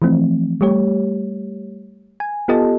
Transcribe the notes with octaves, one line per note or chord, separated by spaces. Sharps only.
E3 F3 A3 C4
G3 A3 G4 C#5
G#5
B3 F4 G4 A4 D#5 A5